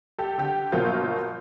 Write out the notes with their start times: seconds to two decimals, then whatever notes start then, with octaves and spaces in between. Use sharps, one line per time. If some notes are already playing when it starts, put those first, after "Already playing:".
0.19 G4 A4
0.38 D3 G4
0.72 G1 B2 F#3 A#3 F4 G6